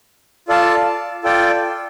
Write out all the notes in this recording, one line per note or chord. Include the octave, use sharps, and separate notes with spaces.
F4 A4 D5 F5 A5
F4 A4 D5 G5